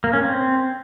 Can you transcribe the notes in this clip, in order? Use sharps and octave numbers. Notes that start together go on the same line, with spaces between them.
A#3
C#4
C4